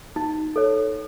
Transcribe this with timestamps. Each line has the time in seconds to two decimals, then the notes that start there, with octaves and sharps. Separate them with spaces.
0.16 D#4
0.56 A4 C#5